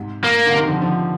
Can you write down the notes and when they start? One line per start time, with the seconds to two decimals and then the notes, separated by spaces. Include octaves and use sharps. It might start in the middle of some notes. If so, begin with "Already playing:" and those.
Already playing: G#2 C3
0.24 A#3
0.46 D3
0.53 C3 D#3
0.67 D3 F3
0.81 D3 F3